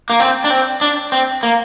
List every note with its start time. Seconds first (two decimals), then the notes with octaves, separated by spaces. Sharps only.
0.10 A#3
0.20 C4
0.44 D4
0.50 C4
0.81 D4
1.12 C4
1.43 A#3